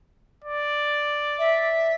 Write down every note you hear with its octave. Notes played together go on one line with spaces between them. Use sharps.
D5
E5